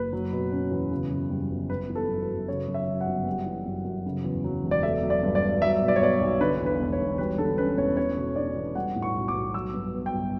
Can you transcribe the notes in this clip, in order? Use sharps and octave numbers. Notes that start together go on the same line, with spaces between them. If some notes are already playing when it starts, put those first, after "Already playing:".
Already playing: F#1 B4
F#3
B2
C#4
E2
C#3
F#2
G3
G1
B3 B4
E3
A4
F#2
B4
F#2
C#3 C#5
F#2
E5
F#3
F#5
G1
G3
E3
F#2
F#2
C#3
E2
F#3
E1
D5
A3 E5
F#3
D5
G2
D5
G2
F#3 E5
B2
D5
C#5
B3 D5
B1
D3 B4
E2
B4
E1
C#5
E1
G3 B4
D3 A4
C#4 B4
E2 C#5
A3 C#5
B2
D4 D5
E2
G3 F#5
A2
C#6
B1
D6
B1
F#3 E6
G2
B3
G5
G1